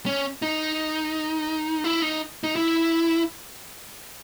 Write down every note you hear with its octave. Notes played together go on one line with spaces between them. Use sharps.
C#4
D#4
E4
D#4
D#4
E4